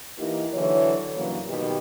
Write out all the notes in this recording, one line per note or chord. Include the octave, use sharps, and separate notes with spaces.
E3 A#3 D#4 E4 G4
D3 E3 F#3 C#5
G2 C#3 E3 F#3 A#3
B2 D#3 G4